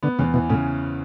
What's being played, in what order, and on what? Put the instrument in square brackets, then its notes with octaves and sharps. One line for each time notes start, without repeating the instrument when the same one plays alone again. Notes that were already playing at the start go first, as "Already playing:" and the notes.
[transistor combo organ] D3 [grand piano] B3
[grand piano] E2 [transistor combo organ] C#3
[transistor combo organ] B2 [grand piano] E3
[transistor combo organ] A2 [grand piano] C#3